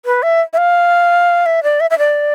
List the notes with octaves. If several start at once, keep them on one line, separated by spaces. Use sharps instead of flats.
B4
E5
E5
F5
E5
D5
E5
E5
D5